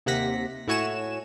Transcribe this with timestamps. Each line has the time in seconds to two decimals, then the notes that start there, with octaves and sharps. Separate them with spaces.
0.06 D#2 C3 A#3 F#5 A#6 B6
0.67 A2 E4 F#4 C#5 G#5 E7